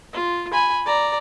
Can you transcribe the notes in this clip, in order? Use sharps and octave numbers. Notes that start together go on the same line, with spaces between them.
F4
G#5 B5
D5 A#5